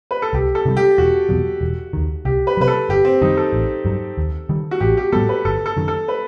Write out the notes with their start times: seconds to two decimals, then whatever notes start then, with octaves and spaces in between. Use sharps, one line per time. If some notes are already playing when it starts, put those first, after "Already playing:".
0.11 B4
0.22 A4
0.33 C2 G4
0.55 A4
0.65 C3 D#3
0.71 G3
0.77 G4
0.98 E1 F#4
1.29 E2 B2 F#3
1.61 E1
1.93 D#2 D#3
2.25 C2 G4
2.47 B4
2.57 C3 F#3 B4
2.68 A4
2.89 G1 G4
3.05 C4
3.22 F#2 D#3 G3 D#4
3.37 A4
3.53 A1
3.85 G2 F#3
4.17 D#2
4.49 D#3 G3
4.71 F#4
4.80 A1 G4
4.97 G4
5.12 A2 G3 B3 A4
5.29 B4
5.45 G1 A4
5.66 A4
5.77 F#2 D#3
5.88 A4
6.08 B4